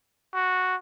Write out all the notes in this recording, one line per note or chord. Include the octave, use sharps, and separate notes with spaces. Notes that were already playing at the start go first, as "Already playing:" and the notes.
F#4